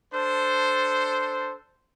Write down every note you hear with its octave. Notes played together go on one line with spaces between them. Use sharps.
D4 A4 C5